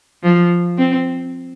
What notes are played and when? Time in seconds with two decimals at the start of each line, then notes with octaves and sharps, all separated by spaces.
0.23 F3
0.78 C4